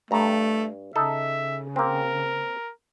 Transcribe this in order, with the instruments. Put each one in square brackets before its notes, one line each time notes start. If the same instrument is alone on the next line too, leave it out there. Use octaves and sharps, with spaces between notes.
[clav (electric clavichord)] G2 A#5 [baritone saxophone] A3
[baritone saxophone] C#3 [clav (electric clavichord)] D#4 A4 [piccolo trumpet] E5
[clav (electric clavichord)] A#3 C4 [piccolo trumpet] A#4